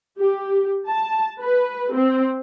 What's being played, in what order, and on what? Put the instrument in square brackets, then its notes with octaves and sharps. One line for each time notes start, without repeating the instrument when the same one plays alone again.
[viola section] G4
A5
B4
C4